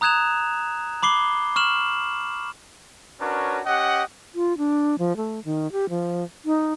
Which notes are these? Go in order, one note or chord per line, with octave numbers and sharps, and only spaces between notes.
A#5 D#6 F#6 G#6 E7 F7
B5 D6 C7 G7
C#6 F6 E7 F#7
C#4 D4 F#4 A#4 B4 C#5
C#4 G4 D#5 F#5
F4
D4
F3
A3
D#3
G4
F3
D#4